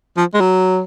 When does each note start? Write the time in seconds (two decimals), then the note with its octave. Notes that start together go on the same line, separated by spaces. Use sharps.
0.17 F3
0.34 G#3
0.40 F#3